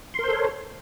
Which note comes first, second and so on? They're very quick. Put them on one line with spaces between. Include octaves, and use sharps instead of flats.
C6 A#4 C5 A4 C#5